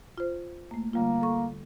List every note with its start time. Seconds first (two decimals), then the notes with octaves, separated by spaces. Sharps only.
0.18 F4 C5
0.71 A3 A#3
0.93 D3 G3 A#3 F4
1.21 A4 C#6